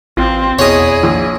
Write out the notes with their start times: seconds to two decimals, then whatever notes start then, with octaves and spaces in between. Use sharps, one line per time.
0.17 A1 C4 F4
0.59 E2 B2 E4 G#4 C#5 D#5
1.03 A#1